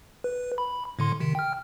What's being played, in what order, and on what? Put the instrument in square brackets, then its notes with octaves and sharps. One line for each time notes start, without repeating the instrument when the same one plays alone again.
[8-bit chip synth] B4
B5
A2 D3 C6
C3 D#3
G5 F6